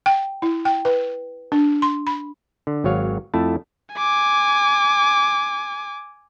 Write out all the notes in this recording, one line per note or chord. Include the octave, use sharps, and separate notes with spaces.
G5
E4
G5
B4
D4
C6
B5
D3
G#1 F#3 C#5 F5
F2 A3 E4 A5
G#5 D6